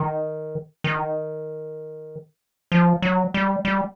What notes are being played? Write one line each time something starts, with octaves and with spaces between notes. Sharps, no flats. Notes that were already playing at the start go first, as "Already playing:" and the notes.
Already playing: D#3
D#3
F3
F#3
G3
G3